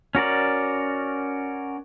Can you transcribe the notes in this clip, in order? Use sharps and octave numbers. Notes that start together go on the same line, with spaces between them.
C#4 F#4 A#4 D5